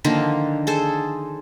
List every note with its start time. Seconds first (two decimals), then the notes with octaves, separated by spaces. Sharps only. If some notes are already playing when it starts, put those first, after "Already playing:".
0.04 D3 D#3 F3 A#3
0.67 G#4 A4 C5